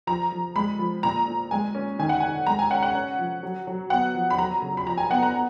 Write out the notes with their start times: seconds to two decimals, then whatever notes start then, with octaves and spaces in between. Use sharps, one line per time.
0.07 F3 A#5
0.32 F3
0.56 G#3 B5
0.79 F3
1.03 A#2 A#5
1.28 A#2
1.51 G#3 G#5
1.75 C#4
1.99 D#3 G#5
2.09 F#5
2.20 D#3 G#5
2.47 G#3 A#5
2.59 G#5
2.71 C#4 F#5
2.83 F#5
2.95 C#4
3.19 F3
3.43 F#3
3.67 F#3
3.90 B3 F#5
4.15 F3
4.30 B5
4.38 F#3 A#5
4.62 C#3
4.77 B5
4.86 F3 A#5
4.98 G#5
5.10 B3 F#5
5.23 A#5
5.34 B3